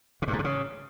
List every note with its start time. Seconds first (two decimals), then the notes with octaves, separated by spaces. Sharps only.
0.22 C3
0.28 G2
0.33 G#2
0.39 C3
0.44 C#3